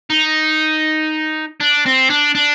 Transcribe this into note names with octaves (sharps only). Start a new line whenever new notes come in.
D#4
D4
C4
D4
D4